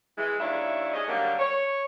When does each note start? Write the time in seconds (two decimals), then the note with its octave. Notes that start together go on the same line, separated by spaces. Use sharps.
0.17 E3 G#3
0.40 D#2 C#4 D4 E4 E5
0.93 G#2 C#4 G#4 D#5
1.09 D3 F#3 G3 A#3
1.39 C#5